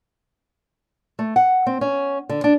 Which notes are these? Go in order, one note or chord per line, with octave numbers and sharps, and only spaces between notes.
A3
F#5
C4
C#4
D3
D4